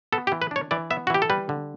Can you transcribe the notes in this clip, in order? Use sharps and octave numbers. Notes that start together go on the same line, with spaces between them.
B3 A4
G4
E3
B4
D4 C#5
E3 D5
B3 E5
F#4
E3 G4
A4
G3 B4
D3